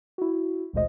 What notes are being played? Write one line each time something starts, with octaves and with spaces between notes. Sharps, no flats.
E4 F#4
G#1 D2 A#2 G#3 C5 D#5